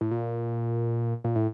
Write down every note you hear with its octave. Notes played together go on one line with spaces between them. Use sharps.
A2
A#2
A#2
A2